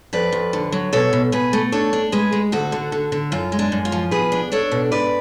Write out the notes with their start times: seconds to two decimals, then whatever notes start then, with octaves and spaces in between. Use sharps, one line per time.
0.13 F2 B4 D5
0.32 F2
0.53 D3
0.72 F#3
0.93 B2 A4 C#5
1.13 B2
1.32 B2 G#4 B4
1.53 A3
1.72 D4 A4 C#5
1.93 D4
2.12 G#3 G#4 B4
2.32 G#3
2.52 D2 F#4 A4
2.72 D3
2.92 D3
3.12 D3
3.32 F#2 F4
3.52 G#3
3.59 D4
3.72 F#2
3.85 F4
3.92 F3
4.11 B2 G#4 B4
4.32 D4
4.52 D4 A4 C#5
4.72 B2
4.92 G#2 B4 D5